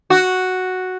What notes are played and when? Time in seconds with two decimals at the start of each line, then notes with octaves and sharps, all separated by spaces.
0.10 F#4